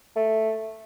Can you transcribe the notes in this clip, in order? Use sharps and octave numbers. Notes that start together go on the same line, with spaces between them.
A3